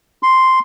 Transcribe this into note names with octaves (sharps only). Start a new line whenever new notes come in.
C6